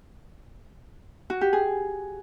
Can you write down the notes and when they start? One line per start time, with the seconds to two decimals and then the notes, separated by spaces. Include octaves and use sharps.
1.30 F#4
1.41 G4
1.53 G#4